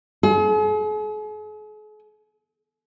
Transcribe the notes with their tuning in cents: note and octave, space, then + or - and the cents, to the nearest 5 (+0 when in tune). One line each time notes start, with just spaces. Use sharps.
G#4 +45